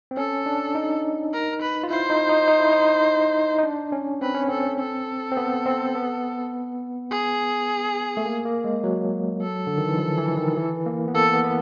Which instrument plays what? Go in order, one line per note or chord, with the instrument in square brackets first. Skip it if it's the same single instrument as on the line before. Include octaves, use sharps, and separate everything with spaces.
[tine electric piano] C4
[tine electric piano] C#4 [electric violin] A4
[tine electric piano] D4
D#4
[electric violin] A#4
B4
[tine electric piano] F4
[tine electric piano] E4 [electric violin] C5
[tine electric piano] D#4
D#4
D#4
E4
D#4
D#4
D4
C#4
[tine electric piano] C4 [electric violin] B4
[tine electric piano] C#4
[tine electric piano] C4 [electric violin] A4
[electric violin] A4
[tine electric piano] C4
B3
C4
B3
[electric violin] G#4
[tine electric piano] A3
A#3
A#3
G#3
F#3
[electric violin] A4
[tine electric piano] D3
D#3
E3
F3
E3
D#3
E3
A#3
B3
[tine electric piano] A#3 [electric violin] A4
[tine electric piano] B3
B3